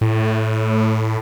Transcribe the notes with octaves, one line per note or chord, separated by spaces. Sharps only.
A2